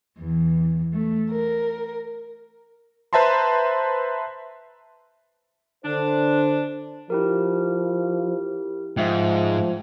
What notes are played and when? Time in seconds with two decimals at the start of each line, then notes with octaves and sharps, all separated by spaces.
0.18 E2
0.93 A3
1.31 A#4
3.13 B4 C5 E5 A5 A#5 C6
5.85 D3 D4 C5
7.10 F3 E4 G4 A#4
8.97 G#2 F3 E5 G5